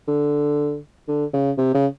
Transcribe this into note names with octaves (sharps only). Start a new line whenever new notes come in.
D3
D3
C#3
C3
C#3